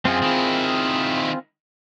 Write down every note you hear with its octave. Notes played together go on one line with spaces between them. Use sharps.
F#2 C4 F4 G#4
D#3 E4